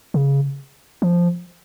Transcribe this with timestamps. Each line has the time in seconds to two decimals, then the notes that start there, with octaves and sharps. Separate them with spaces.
0.14 C#3
1.02 F3